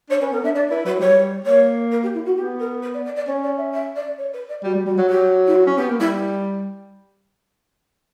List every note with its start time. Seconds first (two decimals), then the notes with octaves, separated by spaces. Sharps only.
0.09 D4 C#5
0.21 C#4 B4
0.32 B3 A#4
0.43 D4 E5
0.55 D4 D5
0.70 E4 B4
0.85 F#3 B4
1.00 G3 C#5
1.45 A#3 C#5
1.91 A#4
2.02 G4
2.14 E4
2.26 F#4
2.37 B3 G4
2.59 A#4
2.82 B4
2.94 D5
3.05 D5
3.16 D5
3.27 C#4 C#5
3.43 D5
3.57 E5
3.73 E5
3.96 D5
4.18 C#5
4.33 B4
4.49 D5
4.63 G3 F#4
4.75 G3
4.86 G3 F#4
4.98 F#3
5.09 F#3 G4
5.47 E4
5.55 F#4
5.67 C#4
5.77 B3 G4
5.89 A#3
6.00 G3 E4